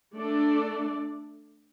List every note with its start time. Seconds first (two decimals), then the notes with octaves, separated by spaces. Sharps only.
0.17 A3 D4 A4 D5